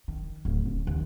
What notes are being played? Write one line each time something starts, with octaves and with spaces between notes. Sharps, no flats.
D#3
D1
C#3
D#2